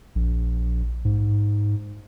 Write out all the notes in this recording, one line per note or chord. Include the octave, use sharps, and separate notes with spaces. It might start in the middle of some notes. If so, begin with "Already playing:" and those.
A#1
G#2